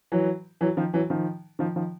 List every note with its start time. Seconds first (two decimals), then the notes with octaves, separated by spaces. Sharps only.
0.12 E3 F#3
0.61 E3 F#3
0.77 D#3 F3
0.94 E3 F#3
1.10 D#3 F3
1.59 D#3 F3
1.76 D#3 F3